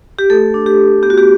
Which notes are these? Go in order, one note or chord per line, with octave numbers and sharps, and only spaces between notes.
G4
A3 A4
D4
G4
A3
B3 G4
F#4
G4